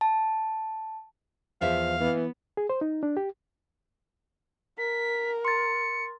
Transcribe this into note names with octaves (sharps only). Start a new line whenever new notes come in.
A5
E2 F3 E5 F5
E3 B3
G#4
C5
D#4
D4
G4
A#4 B6
C6 A6 C#7